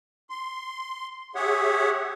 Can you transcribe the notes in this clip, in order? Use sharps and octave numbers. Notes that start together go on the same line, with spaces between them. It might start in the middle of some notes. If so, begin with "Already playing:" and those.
C6
G4 G#4 C#5 E5 F#5